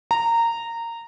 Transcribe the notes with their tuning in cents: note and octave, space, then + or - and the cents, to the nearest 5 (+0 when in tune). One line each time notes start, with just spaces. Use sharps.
A#5 -15